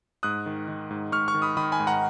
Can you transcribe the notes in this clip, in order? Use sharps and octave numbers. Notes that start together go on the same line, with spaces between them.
G#2 D#6 F#6
D#3
D#3
G#2
G#2 C#6 F6
C#6 F6
D#3
B5 D#6
D#3 B5 D#6
G#5 B5
G#2
F#5 A#5